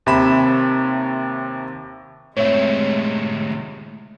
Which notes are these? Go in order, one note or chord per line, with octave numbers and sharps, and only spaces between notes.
D#2 C3 E5 B5 E7
A2 C3 G#3 C#5 E5